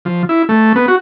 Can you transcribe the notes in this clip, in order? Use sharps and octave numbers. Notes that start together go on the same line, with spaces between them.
F3
E4
A3
B3
F#4